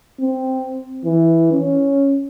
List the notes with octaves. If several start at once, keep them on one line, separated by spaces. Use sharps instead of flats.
C4
E3
C#4